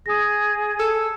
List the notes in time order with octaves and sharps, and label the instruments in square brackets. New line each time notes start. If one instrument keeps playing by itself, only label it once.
[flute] G#4 [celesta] D#6 A#6
[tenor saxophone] A4